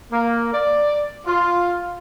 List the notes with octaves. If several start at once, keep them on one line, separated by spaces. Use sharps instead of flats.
A#3
D5
F4